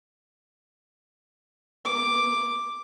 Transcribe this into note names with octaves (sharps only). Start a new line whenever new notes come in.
D6